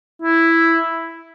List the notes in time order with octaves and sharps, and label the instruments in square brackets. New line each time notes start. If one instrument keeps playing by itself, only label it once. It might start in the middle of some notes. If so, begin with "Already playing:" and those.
[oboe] E4